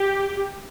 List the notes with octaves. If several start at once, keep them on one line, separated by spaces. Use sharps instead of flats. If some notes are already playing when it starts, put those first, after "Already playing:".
Already playing: G4